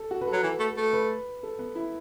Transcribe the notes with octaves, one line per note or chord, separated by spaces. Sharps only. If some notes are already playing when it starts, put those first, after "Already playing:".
Already playing: A4
F#4
B4
A4
F#3
E3
A3
A3
B4
A4
B3
E4